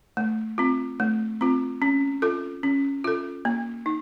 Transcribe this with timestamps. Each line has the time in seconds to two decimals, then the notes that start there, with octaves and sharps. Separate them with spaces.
0.17 A3
0.58 C4 F4
1.00 A3
1.41 C4 F4
1.82 C#4
2.22 F4 A4
2.63 C#4
3.04 F4 A4
3.45 A#3
3.86 D#4